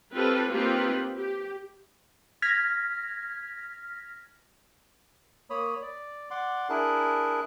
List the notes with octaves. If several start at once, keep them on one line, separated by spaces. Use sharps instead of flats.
C4 F4 G4 A4 B4
A#3 C4 D#4 F4 G4 B4
G4
F6 G#6 A#6 B6
A#3 C#5 B5 D#6
D5
D5 F#5 C6 D6
D4 E4 G#4 A#4 F#6